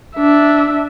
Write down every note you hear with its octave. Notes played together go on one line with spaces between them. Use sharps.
D4 E5